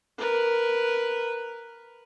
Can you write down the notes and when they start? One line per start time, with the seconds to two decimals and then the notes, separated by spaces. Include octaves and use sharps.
0.18 A#4 B4